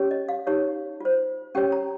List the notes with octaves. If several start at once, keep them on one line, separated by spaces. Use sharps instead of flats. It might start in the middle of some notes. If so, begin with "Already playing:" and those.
Already playing: C#4 G4 C#5
D#5
F5
D#4 G4 C#5
F4 C5
C#4 G4 C#5 G5
A#5